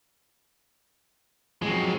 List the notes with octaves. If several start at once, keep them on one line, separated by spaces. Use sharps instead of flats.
F3 F#3 G#3 C4 F#4